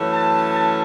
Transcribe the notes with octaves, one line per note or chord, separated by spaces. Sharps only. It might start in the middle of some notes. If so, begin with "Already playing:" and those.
Already playing: F#2 E3 A3 C#4
A5
A5